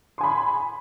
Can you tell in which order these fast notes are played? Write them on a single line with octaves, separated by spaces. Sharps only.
C6 G#5 B5